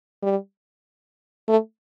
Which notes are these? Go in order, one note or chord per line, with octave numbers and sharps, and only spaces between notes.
G3
A3